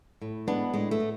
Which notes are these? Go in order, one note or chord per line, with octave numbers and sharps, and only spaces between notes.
A2
G#3 B3 D4
A2 G#3
A3
A2